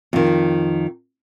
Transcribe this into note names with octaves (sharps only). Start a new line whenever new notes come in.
F2 D#3